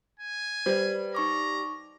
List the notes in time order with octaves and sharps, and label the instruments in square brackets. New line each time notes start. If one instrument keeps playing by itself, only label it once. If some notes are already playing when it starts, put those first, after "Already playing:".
[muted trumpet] G#5
[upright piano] G3 [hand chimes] B4 [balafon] C5 D5
[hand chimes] D#4 C#6 D6 [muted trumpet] A#5